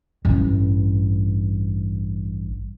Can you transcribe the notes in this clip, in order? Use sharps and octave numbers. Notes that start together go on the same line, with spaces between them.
A1 G2